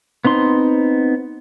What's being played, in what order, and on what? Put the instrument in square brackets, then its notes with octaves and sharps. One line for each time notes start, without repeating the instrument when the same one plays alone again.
[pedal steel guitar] B3 C4 D#4 C6